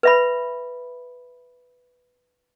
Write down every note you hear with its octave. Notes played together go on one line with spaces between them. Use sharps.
B4 E5 B5